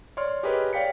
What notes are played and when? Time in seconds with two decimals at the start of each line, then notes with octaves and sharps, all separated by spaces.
0.17 C#5 D5 C6 F6
0.43 G4 G#4 A#4 B4 C#5 D#5
0.73 C#5 D5 F5 G5 B6 C#7